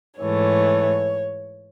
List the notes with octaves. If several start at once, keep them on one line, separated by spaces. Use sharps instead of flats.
G#2 E3 A3 C#5